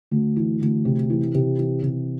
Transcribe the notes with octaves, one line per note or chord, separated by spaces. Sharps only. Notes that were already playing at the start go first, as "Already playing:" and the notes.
D2
E3
D2
C3
E3
C3
E3
C3